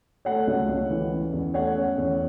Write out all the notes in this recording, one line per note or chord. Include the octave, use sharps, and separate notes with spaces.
A3 C#5 F#5
C#2
C#2
E3
C#4
E2
A3 C#5 F#5
C#4
E2